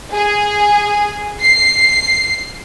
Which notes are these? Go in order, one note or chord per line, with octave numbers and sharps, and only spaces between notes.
G#4
C7